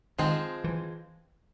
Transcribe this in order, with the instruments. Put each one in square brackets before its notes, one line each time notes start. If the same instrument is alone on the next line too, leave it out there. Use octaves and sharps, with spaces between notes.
[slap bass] D#3 [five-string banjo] F3 G#3 C4
[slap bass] E3